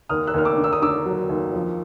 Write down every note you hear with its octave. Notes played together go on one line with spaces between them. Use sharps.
D#2 D#6 F6
E6 F#6
D#2 F6
D6 E6
D3
E6
D#6
D3 D6 E6
F#3
D#2
F3